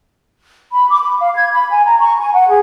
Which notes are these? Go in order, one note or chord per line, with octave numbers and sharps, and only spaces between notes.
B5
D6
B5
F5
G#6
B5
G#5
A#5
C#6
G#5
F#5
G#4